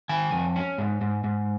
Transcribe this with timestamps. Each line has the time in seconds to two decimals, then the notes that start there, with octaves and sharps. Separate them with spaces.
0.09 D#3 G#5
0.32 F2
0.56 C#4
0.78 G#2
1.01 G#2
1.24 G#2